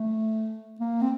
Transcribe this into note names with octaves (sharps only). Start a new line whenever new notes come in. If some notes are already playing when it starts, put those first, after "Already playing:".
Already playing: A3
A#3
C4